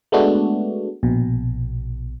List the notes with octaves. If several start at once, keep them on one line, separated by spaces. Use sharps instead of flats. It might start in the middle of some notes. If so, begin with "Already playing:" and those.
G#3 A3 B3 D4 F#4
A#1 B2